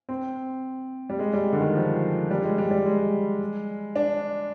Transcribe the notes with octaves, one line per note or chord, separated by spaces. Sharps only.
C4
G3
G#3
G3
D3
D#3
F3
G3
G#3
G3
G3
G#3
D4